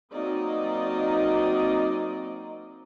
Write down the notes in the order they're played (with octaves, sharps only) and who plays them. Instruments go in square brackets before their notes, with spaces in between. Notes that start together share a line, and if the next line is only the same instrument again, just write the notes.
[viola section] F#3 A#3 C4 D#4 D5 D#5